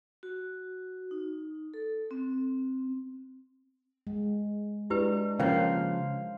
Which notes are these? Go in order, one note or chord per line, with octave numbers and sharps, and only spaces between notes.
F#4
D#4
A4
C4
G#3
G#3 D4 E4 G4 B4
C#3 F3 A#3 C#4 C5 C#5 F5